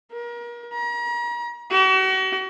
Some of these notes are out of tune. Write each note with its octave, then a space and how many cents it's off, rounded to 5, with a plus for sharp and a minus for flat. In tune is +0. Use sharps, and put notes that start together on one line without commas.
A#4 +35
A#5 +40
F#4 +40